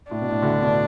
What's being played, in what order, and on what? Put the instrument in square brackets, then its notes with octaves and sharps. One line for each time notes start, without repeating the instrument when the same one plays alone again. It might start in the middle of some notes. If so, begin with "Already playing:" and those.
[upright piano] A2 [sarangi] D4
[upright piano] B2
A2
D2 D3
B2